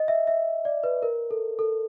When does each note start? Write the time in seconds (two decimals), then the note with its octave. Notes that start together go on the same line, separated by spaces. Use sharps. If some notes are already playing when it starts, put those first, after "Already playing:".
Already playing: D#5
0.08 E5
0.27 E5
0.65 D5
0.83 B4
1.03 A#4
1.31 A4
1.59 A4